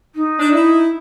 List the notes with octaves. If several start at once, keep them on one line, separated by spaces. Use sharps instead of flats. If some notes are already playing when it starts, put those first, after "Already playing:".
D#4
D4
E4